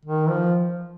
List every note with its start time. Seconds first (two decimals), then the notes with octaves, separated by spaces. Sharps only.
0.05 D#3
0.29 F3